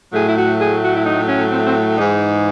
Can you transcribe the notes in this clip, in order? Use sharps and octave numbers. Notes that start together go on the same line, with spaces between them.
A2 F#3 A3 G#4
E4
F#4
G#4
F#4
E4
D#4
C#4
C4
C4
G#2 E3 G#3 D#4